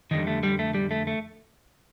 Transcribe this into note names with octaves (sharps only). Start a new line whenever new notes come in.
F2 D3 D#3 G3 D#4
A3
G3
A3
G3
A3
A3